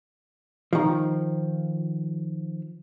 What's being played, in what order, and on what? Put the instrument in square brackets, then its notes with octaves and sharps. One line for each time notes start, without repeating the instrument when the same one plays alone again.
[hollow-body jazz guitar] D#3 F3